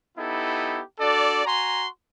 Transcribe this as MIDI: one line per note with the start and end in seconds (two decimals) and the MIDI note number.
0.17 0.81 59
0.17 0.81 63
0.17 0.81 64
0.17 0.81 67
0.17 0.81 69
1.00 1.44 62
1.00 1.44 66
1.00 1.44 69
1.00 1.44 74
1.45 1.86 66
1.45 1.86 80
1.45 1.86 82
1.45 1.86 84